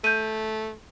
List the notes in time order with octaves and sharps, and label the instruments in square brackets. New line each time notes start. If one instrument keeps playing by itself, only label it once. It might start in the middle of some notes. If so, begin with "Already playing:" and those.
[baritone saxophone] A3 [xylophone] G6 D#7